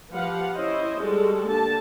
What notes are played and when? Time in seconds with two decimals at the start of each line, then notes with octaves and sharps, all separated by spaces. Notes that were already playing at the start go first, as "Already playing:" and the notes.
0.11 F3 G4 B4 F5 F#5
0.55 C#4 E4 C5 D#5
1.00 G3 G#3 F#4 G#4 A4
1.46 D3 A#3 G4 A4 A5